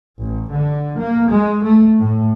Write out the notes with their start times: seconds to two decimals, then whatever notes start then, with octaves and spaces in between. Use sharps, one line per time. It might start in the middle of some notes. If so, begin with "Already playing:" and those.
0.20 A1
0.52 D3
0.97 A#3
1.31 G#3
1.64 A3
1.98 A2